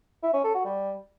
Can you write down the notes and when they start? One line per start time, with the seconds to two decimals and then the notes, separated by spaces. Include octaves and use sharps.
0.23 E4
0.34 C#4
0.44 A4
0.55 F#4
0.65 G3